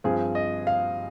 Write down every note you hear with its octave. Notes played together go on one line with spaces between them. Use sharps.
G2 F3 C4 G#4
D#5
F5